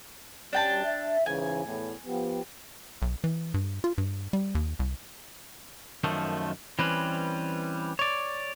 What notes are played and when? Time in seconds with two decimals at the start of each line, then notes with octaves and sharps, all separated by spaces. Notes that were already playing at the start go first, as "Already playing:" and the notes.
0.53 F#2 G3 D4 G5 A5
0.85 E5
1.26 G#2 C#3 E3 G#5
1.65 E2 A2
2.07 F3 B3 G4
3.02 B1
3.24 E3
3.54 G2
3.84 F4
3.98 G2
4.33 G3
4.55 D#2
4.79 C2
6.04 F#2 D#3 F3 A3
6.79 E3 G3 C4 C#4 B4
7.99 C#5 D5